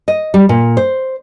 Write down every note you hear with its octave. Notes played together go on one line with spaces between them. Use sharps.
D#5
G3
A#2
C5